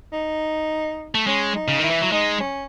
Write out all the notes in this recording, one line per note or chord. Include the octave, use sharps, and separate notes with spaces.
D#4
A3
G#3 C#4
D#4
C#3
D#3 E4
E3
F#3
G#3 D#4
C#4